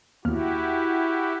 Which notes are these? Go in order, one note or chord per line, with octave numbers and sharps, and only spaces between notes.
D#2 E4 F#4 G4 F6